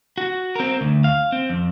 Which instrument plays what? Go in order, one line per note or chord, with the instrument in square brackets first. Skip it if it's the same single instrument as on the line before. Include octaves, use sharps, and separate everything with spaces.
[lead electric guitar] F#4
C4 A#4
D2
F5
C4
F2